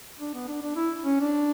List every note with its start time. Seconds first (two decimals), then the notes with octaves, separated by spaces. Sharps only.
0.20 D4
0.34 B3
0.48 D4
0.62 D4
0.76 E4
1.05 C#4
1.20 D4